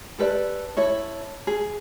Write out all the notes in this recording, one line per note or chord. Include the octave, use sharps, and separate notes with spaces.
G4 A4 B4 D5
E4 A4 C#5
G#4